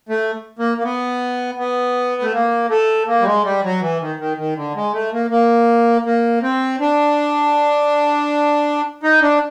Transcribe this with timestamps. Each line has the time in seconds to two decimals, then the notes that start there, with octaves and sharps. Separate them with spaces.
0.09 A3
0.59 A#3
0.78 A#3
0.84 B3
1.59 B3
2.22 A3
2.33 A#3
2.69 A3
3.07 A#3
3.21 G3
3.26 G#3
3.44 G3
3.64 F#3
3.81 E3
4.00 D#3
4.19 D#3
4.37 D#3
4.56 D3
4.75 G#3
4.93 A3
5.13 A#3
5.30 A#3
6.05 A#3
6.42 C4
6.80 D4
9.03 D#4
9.22 D4